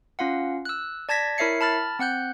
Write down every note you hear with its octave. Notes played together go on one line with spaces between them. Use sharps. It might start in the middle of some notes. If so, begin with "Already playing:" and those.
C#4 F4 F5 F#5
E6 F#6
D5 A5 G#6 A#6 B6
E4 A#4 C#5 E5 C7 C#7
A5 B5 F6 A6
C4 F#5 F#6 G6